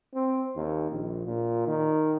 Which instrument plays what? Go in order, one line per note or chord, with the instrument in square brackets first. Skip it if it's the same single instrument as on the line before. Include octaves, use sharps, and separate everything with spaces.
[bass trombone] C4
D#2
A#1
A#2
D#3